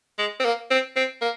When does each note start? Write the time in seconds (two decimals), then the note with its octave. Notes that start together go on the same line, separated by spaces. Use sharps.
0.18 G#3
0.40 C4
0.45 A#3
0.70 C4
0.96 C4
1.21 A#3